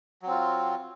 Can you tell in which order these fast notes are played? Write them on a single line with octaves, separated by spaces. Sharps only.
F#3 C4 F4